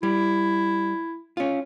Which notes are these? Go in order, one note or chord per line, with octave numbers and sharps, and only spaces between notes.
G3 E4
C#4 F4